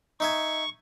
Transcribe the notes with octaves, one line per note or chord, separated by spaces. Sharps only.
D#4 E5 G#5 C#6